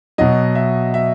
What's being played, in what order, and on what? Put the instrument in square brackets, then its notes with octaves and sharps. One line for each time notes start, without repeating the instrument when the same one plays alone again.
[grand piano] B2 F#3 D#5
E5
E5